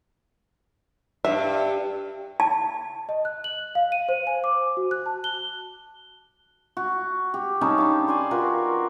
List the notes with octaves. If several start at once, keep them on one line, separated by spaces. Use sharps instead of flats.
G2 E5
A5
D#5
F#6
F#7
F5
D#7
C5
G#5
D6
F#4
F#6
A5
G7
F#4
G4
G3 C#4 D#4 A5
D4 F5
C5 D5 G#5 C#6
F4 F#4 A#4 B4